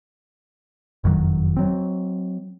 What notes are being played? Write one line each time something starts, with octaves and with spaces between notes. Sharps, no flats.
F#1 F2 D#3 F#3
F#3 C4